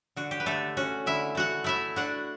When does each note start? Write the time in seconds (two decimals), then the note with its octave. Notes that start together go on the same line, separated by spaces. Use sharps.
0.16 D3 F#4
0.31 G4
0.40 B4
0.46 D3 A3 A4
0.77 C#4 F#4
1.06 D3 E4 E5
1.35 A3 F#4 F#5
1.64 A3 E4 E5
1.96 D4 F#4 F#5